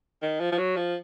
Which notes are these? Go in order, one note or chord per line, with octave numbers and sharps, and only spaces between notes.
D#3
F3
F3
F#3
F3